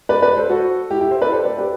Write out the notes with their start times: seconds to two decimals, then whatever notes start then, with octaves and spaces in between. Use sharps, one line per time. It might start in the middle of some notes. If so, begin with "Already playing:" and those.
0.09 B4 D5
0.22 B4 D5
0.36 A4 C5
0.49 F#4 A4
0.91 E4 G4
1.01 E4 G4
1.11 C5 E5
1.21 B4 D5
1.32 A4 C5
1.45 B4 D5
1.58 G4 B4